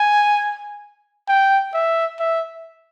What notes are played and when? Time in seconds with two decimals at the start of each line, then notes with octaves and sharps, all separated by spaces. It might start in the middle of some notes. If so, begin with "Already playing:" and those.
Already playing: G#5
1.28 G5
1.74 E5
2.20 E5